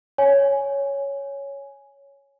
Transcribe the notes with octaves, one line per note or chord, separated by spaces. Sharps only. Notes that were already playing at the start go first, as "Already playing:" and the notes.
C#5 G#5